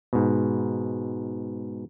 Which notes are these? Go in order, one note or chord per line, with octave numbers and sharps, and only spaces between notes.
G#2 B2